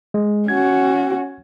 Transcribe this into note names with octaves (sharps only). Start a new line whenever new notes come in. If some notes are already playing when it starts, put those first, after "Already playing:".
G#3
C#4 F#4 G#6